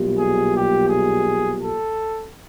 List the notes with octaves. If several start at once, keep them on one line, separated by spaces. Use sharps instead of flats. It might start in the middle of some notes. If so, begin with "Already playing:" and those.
Already playing: B1 A#2 G3
G#4
G4
G#4
A4